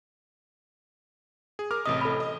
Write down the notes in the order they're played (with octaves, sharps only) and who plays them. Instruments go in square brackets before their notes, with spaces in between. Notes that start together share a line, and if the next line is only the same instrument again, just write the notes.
[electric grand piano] G#4
A#4 D6 F6
[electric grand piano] A1 C3 D#5 [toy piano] D#6
[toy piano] A4 B5
[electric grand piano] D#5